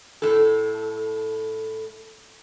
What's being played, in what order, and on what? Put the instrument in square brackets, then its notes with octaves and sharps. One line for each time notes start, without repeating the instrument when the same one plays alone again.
[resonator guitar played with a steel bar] A2 A4